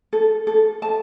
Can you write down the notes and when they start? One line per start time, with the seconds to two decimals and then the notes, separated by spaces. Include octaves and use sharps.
0.13 A4
0.47 A4
0.82 A5